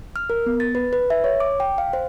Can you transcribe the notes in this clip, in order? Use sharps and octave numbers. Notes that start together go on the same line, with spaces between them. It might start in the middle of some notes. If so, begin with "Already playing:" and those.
F6
A#4
B3
A6
B4
B4
E5
C#5
D6
G5
F5
C5